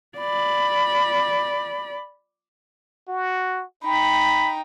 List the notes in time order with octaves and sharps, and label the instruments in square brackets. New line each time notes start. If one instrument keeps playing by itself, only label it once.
[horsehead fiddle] D5 B5
[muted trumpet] F#4
[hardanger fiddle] D#4 G5 [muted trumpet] B5